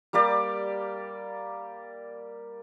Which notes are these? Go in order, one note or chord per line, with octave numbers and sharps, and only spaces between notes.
G3 A#3 G4 D5